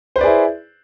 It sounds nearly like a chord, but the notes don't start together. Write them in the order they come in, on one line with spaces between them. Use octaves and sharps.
C5 B4 D5 G#4 E4